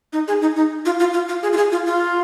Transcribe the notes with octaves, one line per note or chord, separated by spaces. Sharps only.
D#4
G#4
D#4
D#4
F4
F4
F4
F4
G#4
F4
G#4
F4
F4